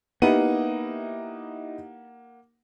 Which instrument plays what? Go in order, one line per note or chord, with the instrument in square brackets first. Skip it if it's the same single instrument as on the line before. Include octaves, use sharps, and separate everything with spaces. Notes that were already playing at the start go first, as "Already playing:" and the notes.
[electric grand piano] A#3 F#5 D#7 [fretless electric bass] B3 [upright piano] D#4 E4 G4